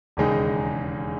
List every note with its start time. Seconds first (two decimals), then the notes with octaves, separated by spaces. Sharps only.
0.17 E1 D#2 C#3 G#3 D#4